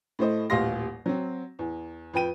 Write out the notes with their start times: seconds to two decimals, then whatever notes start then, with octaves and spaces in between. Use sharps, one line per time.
0.19 A2 A3 C5 D#5
0.50 D#1 A1 G4 F5 C6 A#6
1.06 F#3 C4
1.59 E2
2.14 F2 B4 G5 D#7